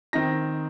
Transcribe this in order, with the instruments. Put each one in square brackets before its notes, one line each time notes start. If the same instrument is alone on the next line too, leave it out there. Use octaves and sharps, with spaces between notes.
[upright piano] D#3 C4 D#4 A#6